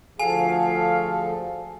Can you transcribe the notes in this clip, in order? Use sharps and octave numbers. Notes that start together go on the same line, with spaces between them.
D2 F3 F#4 G#4 A4 F5 G#5